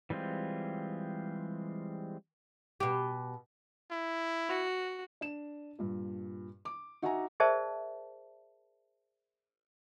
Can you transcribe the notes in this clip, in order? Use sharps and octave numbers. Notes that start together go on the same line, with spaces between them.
E3 G3 G#3 C4 F4
B2 G4
E4
F#4
D4 E7
G2 A#2
D6
D#4 F#4 E5 F#5 G#5 A#5
G#4 A#4 C5 D5 E5 A5